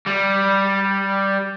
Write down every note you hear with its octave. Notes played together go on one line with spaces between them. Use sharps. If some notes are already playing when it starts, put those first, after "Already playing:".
G3